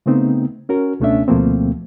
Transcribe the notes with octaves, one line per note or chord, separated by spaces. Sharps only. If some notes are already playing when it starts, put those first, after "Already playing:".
C#3 A3 B3 C4 D#4
C#4 F#4 A#4
C#2 B2 A3 C#4 D4 E5
D2 B2 F3 A3 A#3 C4